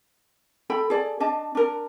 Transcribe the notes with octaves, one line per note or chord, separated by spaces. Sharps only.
A4 G5 B5
G#4 A4 D5
D4 D#5 A5
D4 A#4